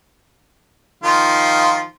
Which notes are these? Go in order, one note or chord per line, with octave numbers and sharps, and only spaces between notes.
D#3 F3 F4